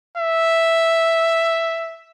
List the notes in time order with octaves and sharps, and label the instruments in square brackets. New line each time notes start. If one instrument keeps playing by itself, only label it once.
[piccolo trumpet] E5